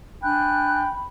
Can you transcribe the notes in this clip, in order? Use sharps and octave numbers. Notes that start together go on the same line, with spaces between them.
D4 G5 G#5 B5 F#6